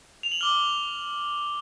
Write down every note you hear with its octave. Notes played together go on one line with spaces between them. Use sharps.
F7
F#7
D6 F6 G7